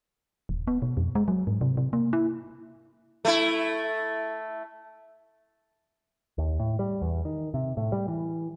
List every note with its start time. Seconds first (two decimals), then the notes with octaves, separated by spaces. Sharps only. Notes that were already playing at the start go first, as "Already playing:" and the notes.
0.49 D#1
0.67 B3
0.82 B2
0.97 F2
1.15 G#3
1.28 F#3
1.47 G#2
1.61 C3
1.77 C3
1.93 A#3
2.13 E4
3.25 A3 E4
6.38 D#2
6.59 A2
6.79 G3
7.02 E2
7.25 D#3
7.54 C3
7.77 A2
7.92 G3
8.08 E3